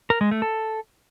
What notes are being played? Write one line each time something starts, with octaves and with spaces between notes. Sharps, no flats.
A#4
G#3
A3
A4